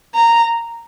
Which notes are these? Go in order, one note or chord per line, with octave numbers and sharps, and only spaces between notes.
A#5